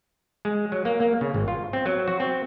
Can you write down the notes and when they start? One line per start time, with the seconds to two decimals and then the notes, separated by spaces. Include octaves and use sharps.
0.45 G#3
0.72 F#3
0.85 A#3
1.00 A#3
1.21 C#3
1.34 G#1
1.48 F4
1.73 C4
1.86 F#3
2.08 F#4
2.20 C4